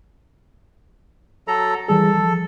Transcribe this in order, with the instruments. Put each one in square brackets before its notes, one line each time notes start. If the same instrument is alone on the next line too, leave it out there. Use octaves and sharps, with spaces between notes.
[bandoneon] F#3 A4 A#5
[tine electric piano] E3 G3 G#4 [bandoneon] A4
[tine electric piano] F3